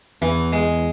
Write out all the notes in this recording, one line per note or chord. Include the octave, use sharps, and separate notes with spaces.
E2 E3
G#3